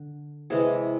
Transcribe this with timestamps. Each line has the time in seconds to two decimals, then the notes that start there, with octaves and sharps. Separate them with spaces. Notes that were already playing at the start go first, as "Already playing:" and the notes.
Already playing: D3
0.50 C3 E3 G#3 G#4